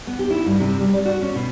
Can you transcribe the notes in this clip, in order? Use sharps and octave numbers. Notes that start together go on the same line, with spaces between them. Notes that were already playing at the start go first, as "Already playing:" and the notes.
B3
G4
E4
G2
C3
G3
D5
F#4
C#4
B2